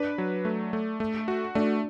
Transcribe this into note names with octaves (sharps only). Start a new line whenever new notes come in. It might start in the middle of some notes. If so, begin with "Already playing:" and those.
Already playing: D4 B4
F#3
A3
A3
A3
F#4
A3 D4